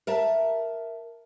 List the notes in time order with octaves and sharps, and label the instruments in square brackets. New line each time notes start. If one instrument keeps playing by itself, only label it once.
[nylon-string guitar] A#4 E5 A5